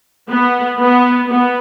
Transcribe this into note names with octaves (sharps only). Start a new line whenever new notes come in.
B3
B3
B3